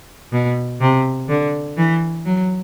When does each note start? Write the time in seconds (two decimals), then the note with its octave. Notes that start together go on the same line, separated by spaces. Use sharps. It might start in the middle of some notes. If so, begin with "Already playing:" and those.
0.33 B2
0.81 C3
1.29 D3
1.77 E3
2.25 F#3